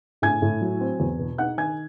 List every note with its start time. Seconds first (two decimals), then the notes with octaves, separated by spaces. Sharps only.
0.22 A2 G#5 G#6
0.42 A2
0.61 F#3
0.81 C4
1.00 E2
1.19 B2
1.38 D#4 F#5 F#6
1.58 D#3 G#5 G#6